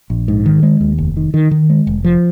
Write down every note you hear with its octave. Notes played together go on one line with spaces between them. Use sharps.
A#1
G#2
D#3
G#3
D#2
F1
D#3
D#3
D#3
G#3
F1
F3